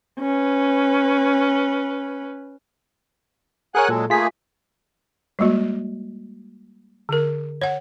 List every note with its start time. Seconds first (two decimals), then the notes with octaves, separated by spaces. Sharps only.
0.19 C#4 B4
3.75 G#4 A#4 C#5 F#5 G#5 F#6
3.89 A#2 F#3 G#3 A4
4.10 A3 A#3 F4 G#4 B6
5.39 G3 G#3 A#3 F#4
7.09 D3 A#4
7.62 C#5 F#5